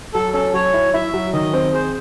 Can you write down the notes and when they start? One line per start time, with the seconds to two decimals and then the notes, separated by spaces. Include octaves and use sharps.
0.14 F#3 A4
0.34 C#4 A4
0.53 F#3 C#5
0.74 E4
0.94 E4 E5
1.14 F#3
1.33 D#3 D#5
1.54 C4
1.73 G#4 C5